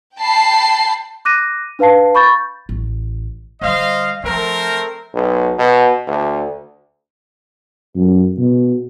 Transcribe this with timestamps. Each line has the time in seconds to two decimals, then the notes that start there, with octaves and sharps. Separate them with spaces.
0.18 G5 A5 B5 C7
1.25 D6 F#6 A#6 D#7
1.79 D4 B4 F5 A5 C7
2.15 B5 C#6 G6 A6
2.69 A1
3.61 D3 G3 C5 D#5 F5
4.24 F3 A3 C4 A#4
5.14 B1
5.59 B2
6.07 D2
7.96 F#2
8.38 B2